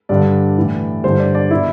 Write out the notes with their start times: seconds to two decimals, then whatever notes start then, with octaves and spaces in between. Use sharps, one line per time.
0.09 G2 D3 D5
0.57 A2 E3
1.04 G2 D3 C5
1.20 D5
1.35 D5
1.51 B2 E4